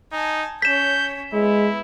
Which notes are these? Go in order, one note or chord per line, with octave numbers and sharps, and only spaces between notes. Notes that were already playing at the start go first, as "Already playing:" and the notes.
D#4 G#5 A5
C#4 C#5 G6 B6 E7
G#3 B3 E4